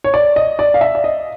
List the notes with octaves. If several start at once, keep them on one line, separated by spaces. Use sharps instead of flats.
C#5
D5
D#5
D5
F5
E5
D5
D#5